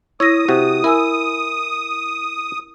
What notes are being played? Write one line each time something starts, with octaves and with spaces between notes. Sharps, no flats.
E4 C#5 D#6 E6 A#6
C3 F#4
E4 A#4 G#5 E6